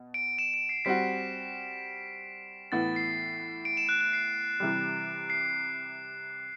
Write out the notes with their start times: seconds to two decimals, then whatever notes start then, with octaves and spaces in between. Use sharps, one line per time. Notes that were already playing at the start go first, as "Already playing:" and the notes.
Already playing: B2
0.14 D7
0.38 E7
0.54 D7
0.69 C7
0.85 G3 C4 F#4 B6
2.72 A2 E3 B3 A6
2.96 C7
3.65 D7
3.77 E7
3.89 F#6
4.01 F#6
4.13 C7
4.60 C3 E3 G3
5.30 C7